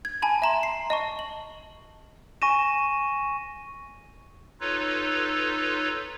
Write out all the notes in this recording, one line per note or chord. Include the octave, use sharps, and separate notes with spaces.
G#6
G#5 A5 B5
E5 A#5 C6
C7
D#5 A5 C#6
F#7
G#5 C#6 A#6 D#7 E7
D#4 F4 A4 B4 C#5